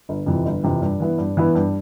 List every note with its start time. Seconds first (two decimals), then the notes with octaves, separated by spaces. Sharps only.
0.09 G1
0.26 F2 C3 E3
0.45 G1
0.63 F2 C3 E3
0.82 G2
1.00 E3 B3 E4
1.18 G2
1.37 E3 B3 E4
1.55 G2